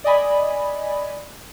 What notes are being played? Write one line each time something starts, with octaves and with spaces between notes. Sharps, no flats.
D5 D#5 G#5 B5